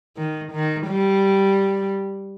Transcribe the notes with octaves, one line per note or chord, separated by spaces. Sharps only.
D#3
D#3
G3